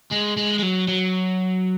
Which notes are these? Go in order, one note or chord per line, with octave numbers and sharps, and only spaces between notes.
G#3
G#3
G#3
F#3
F#3